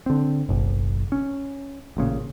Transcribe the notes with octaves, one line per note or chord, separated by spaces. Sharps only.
D3 C4
F#1 B1
C#4
A1 A#2 C#3